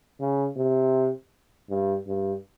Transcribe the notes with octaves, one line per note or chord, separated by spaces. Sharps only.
C#3
C3
G2
G2